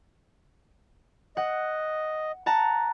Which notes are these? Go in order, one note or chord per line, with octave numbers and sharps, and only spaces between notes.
D#5 F#5
F#5 A5 A#5